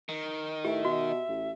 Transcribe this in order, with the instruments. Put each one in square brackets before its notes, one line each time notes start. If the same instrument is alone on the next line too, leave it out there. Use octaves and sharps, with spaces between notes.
[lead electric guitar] D#3
[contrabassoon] A2 [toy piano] G4 [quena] E5
[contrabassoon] B2 [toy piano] F#4
[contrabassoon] A1